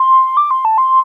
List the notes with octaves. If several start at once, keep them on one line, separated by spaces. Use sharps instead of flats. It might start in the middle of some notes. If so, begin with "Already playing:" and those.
Already playing: C6
D6
C6
A5
C6